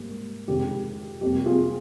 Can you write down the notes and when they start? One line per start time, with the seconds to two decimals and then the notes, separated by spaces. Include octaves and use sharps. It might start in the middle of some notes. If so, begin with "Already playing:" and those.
Already playing: G#2 G3 A#3
0.48 F2 D#3 G#3 G4
1.21 F2 C3 G3 A#3 G4
1.46 F4 G#4